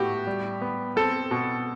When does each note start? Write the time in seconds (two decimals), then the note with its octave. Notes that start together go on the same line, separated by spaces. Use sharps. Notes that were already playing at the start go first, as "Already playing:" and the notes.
Already playing: A2 B3 F#4 G4
0.27 G3
0.61 B3
0.96 C4 A4
1.31 B2